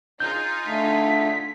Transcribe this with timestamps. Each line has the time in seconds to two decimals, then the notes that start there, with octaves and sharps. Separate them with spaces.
0.20 D#4 F4 G#4 G6
0.67 D3 A3 B6